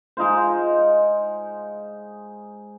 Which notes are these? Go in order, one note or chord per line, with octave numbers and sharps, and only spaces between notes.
G#3 D#4 F4 C5